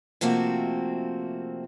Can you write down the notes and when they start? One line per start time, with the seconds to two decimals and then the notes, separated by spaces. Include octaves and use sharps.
0.21 C3 F3 A3 A#3 C4 F#4